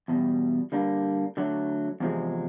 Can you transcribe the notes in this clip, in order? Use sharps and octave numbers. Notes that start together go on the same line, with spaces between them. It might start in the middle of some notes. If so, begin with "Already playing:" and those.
E2 B2 G3
D3 G3 A#3 D4
D3 F#3 A3
E2 C3 F3 G#3